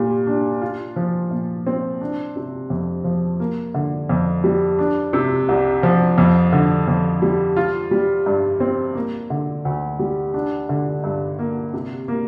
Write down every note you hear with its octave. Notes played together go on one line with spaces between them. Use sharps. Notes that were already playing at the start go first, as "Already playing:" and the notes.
Already playing: A#2 G3
D4
F4
F3
A#2
C4
D4
C3
F2
F3
A#3
D3
F2
G3
D4
C3
C2
F3
F2
D3
F2
G3
F4
G3
G2
C4
A#3
D3
D2
G3
D4
D3
G2
A#3
C3
A#3